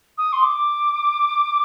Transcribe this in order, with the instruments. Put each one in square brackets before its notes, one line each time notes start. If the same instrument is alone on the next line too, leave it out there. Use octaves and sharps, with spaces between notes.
[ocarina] D#6
C6
D6